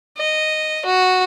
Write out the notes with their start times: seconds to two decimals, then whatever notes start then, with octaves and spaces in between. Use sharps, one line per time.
0.18 D#5
0.86 F#4